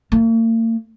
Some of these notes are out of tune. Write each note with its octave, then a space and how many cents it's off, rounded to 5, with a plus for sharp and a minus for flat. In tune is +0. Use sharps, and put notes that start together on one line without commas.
A#3 -45